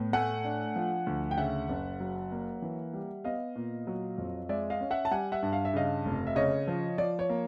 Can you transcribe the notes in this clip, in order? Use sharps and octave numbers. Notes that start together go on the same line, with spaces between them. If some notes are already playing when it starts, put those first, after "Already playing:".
Already playing: A2 B3
A3 F#5 G#5
D4
F3
D2
G5
C#3 E5 F#5
F#1
F#3
A#3
E3
G3
B3 D#5 F5
A#2
F#3
F2
G#3 D5 E5
D#5 F5
C#4
E5 F#5
A5
G3 F#5 G#5
E5 F#5
G2
F5
E5
C#3 D#5 F5
F1
E5
C#3 C#5 D#5
F3
F3 D5
C#5
A#3